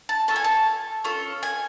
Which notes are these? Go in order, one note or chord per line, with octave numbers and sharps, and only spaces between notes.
A5
C#4 F4 A4 A5
G#5
A5
C#4 F4 A4
G#5